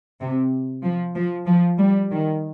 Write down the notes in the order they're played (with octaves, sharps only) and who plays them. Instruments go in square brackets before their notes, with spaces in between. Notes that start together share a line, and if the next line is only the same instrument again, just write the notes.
[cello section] C3
F3
F3
F3
G3
D#3